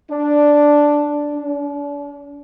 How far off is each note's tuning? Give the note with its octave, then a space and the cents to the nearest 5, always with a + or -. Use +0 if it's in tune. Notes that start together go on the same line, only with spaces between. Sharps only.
D4 +0
D4 -40